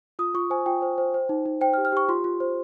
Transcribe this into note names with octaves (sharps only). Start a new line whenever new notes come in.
F4 D#6
F4 C#6
C5 G#5
F4 G5
C5
C5
C5
D#4
D#4
C5 G5
F6
G4
F6
G4 C#6
F4 C6
F4
C5